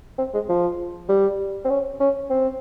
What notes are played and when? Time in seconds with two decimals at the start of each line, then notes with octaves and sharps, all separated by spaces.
0.18 C4
0.34 G#3
0.49 F3
1.09 G3
1.65 C4
1.70 C#4
2.00 C#4
2.30 C4